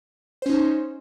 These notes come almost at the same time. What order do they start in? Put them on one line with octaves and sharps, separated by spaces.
C5 C#4 D#4